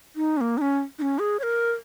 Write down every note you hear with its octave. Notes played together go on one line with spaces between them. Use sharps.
D#4
C#4
A#3
D#4
C#4
D#4
C#4
G#4
C#5
A#4